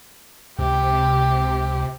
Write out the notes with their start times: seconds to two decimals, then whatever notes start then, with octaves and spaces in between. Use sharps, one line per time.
0.59 C#2 C3 G4